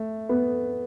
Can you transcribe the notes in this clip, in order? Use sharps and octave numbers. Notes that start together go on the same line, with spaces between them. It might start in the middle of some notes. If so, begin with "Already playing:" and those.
Already playing: A3
B3